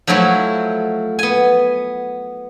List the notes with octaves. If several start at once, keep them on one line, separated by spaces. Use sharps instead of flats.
F3 F#3 A3 E4 F#4
B3 G#5